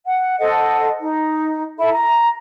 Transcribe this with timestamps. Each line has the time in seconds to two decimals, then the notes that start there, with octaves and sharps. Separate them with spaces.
0.05 F#5
0.39 A4 C5 D#5 F#5
0.99 D#4
1.78 E4 A4 E5 B5
1.91 A#5